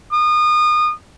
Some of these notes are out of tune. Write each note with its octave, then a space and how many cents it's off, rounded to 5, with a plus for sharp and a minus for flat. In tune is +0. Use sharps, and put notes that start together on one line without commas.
D#6 -30